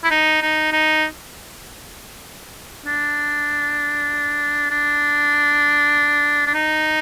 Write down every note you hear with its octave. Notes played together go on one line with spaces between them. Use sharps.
E4
D#4
D#4
D#4
D4
D4
D4
D#4